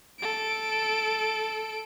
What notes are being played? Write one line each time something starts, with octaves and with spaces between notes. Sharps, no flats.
A4 D7